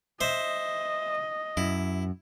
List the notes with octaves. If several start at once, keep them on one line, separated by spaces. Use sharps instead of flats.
C5 D#5 E5
F#2 E4